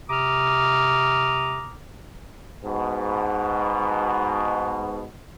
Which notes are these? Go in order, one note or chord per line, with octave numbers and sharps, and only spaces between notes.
C3 A#5 D6 D#6 F6
G#2 B2